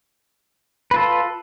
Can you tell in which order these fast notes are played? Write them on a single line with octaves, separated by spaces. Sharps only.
B4 F4 A4